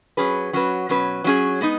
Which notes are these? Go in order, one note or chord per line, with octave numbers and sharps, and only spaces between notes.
F#3 C#4 G#4 B4
F#3 C#4 F#4 B4
B2 F#3 C#4 B4
F#3 C#4 G#4
G#3 B3 D#4